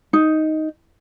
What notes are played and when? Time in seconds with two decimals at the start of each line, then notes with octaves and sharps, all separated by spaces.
0.13 D#4